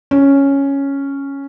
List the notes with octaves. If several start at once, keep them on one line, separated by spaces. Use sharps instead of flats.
C#4